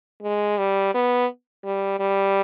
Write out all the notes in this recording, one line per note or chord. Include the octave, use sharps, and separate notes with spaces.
G#3
G3
B3
G3
G3